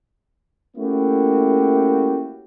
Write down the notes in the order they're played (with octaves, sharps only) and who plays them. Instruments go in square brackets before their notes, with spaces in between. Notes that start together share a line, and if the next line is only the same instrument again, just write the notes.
[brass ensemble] A3 A#3 C#4 E4 F#4 G4